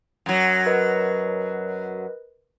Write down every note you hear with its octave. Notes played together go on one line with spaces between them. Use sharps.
F#2 F#3
A#4 B4 D#5